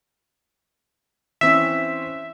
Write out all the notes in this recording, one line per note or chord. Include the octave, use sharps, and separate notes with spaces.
E3 C4 C#4 E5